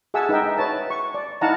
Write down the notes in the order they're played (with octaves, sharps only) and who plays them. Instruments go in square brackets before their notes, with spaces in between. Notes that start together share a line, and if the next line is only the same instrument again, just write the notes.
[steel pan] G#4 E5 F#5 G#5 A5 E6
D#4 B4 D#5 E5 G5
B4 C#5 A5
C#6
D5
D#4 E4 F5 F#5 A5 A#5